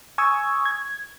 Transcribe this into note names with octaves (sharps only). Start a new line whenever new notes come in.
G#5 C#6 D#6 E6 G#6
G#6